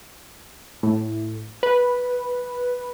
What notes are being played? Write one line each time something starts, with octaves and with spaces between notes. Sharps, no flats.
A2
B4